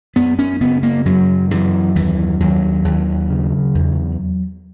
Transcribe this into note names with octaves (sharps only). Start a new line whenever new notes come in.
F#2 B3
C#4
C#3 B3
A#3
F#2 F#3
F#2 E3
D#2 E3
D#2 F#3
D#2
C#3
E2